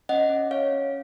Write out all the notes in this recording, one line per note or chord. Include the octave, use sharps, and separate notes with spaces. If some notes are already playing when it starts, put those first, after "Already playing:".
C#4 D#5 F#5
C#4
C#4 C#5 F5
C#4